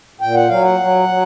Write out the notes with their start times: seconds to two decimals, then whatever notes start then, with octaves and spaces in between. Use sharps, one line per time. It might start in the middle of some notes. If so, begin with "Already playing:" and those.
0.20 A#2 G5
0.34 F#5
0.49 F#3 F5
0.63 F#5
0.80 F#3
1.08 F#3